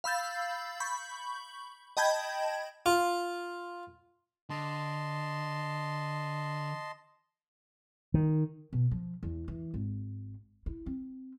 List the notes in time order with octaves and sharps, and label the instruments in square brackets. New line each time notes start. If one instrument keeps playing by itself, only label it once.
[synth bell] F5 B5 E6 G6 A6
B5 C#6 G6
D#5 G5 A5 B5 G6 G#6
[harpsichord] F4
[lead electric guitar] D3 [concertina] D#5 A5 C6
[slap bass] D#3
[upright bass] B2
F3
E2
E3
G#1
E4
C4